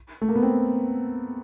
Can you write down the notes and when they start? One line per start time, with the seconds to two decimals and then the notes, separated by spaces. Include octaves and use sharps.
0.21 A3
0.28 A#3
0.35 B3
0.43 C4